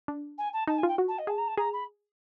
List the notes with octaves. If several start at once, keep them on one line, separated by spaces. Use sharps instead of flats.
D4
G#5
A5
D#4 A5
G#5
F4 G5
F#4
A5
D#5
G#4 A5
A#5
A5
G#4 A#5
B5